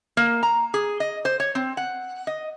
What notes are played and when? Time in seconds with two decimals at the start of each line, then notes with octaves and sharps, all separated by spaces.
0.17 A#3
0.43 A#5
0.74 G#4
1.00 D#5
1.25 C5
1.40 C#5
1.55 C4
1.77 F#5
2.27 D#5